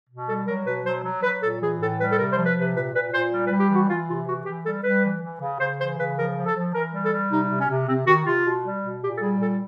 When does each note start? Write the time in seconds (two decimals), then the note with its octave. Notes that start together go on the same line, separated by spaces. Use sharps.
0.09 B2
0.27 G3 A4
0.47 F#3 A#4
0.65 B2 B4
0.84 F#3 C5
1.04 F#3
1.23 F#3 B4
1.41 A#2 A4
1.61 E3 G#4
1.80 A2 A4
1.99 G3 B4
2.09 A4
2.18 C3 A#4
2.32 C5
2.37 F3
2.46 B4
2.55 C3
2.61 B4
2.75 A#2 B4
2.94 A#2 B4
3.12 A#2 C5
3.31 G3
3.46 B4
3.51 G3
3.60 G4
3.69 E3 F#4
3.88 E3 F4
4.08 C3 F4
4.26 E3 F#4
4.45 E3 G4
4.64 G3 A4
4.84 G3 B4
5.03 E3
5.22 E3
5.41 C#3
5.60 C#3 C5
5.78 E3 C5
5.97 C#3 B4
6.16 F3 A#4
6.36 F3
6.45 A4
6.55 F3
6.73 E3 A#4
6.92 G3
7.02 A4
7.12 G3
7.31 C3 D#4
7.50 C3
7.59 C#4
7.69 C3
7.88 C3 C4
8.07 D#3 F#4
8.25 C3 F4
8.44 B2
8.63 G3
8.83 B2
9.02 A#2 G4
9.16 A4
9.20 G3 G#4
9.39 A#2 A4